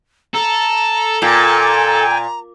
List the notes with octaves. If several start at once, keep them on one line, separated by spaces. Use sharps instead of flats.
A4 A#5
A#2 G5 G#5 A#5